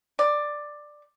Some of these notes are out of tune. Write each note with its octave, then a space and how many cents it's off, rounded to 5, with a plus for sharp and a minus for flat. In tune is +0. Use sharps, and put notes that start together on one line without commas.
D5 +10